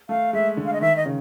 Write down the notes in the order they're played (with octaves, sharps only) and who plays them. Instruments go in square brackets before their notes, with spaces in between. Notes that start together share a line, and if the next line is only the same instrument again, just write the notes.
[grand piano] A3 [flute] F5
[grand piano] G#3 [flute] E5
[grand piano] D3
[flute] F5
D#5
[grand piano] D#3 [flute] E5
[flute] D#5
[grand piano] C#3